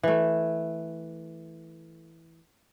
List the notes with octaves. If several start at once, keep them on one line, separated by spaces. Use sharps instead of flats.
E3 A3